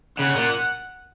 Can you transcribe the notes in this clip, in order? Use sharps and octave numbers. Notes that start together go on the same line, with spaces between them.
C#3 F#5
A#2